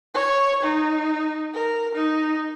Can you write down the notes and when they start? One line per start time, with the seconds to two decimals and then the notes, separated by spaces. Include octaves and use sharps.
0.14 C#5
0.63 D#4
1.54 A#4
1.95 D#4